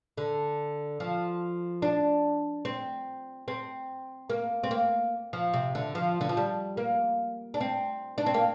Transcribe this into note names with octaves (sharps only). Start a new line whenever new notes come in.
D3
F3
D4
C4
C4
A#3
C4
A#3
F3
C3
D3
F3
D3
F3
G3
A#3
D4
C4
D4
C4
A#3